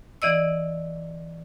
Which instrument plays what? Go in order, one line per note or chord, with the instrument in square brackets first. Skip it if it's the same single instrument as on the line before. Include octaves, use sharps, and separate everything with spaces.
[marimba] E3 D5 D#5 E6